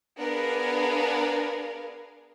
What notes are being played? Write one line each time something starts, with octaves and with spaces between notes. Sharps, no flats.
B3 D4 G#4 A#4 F5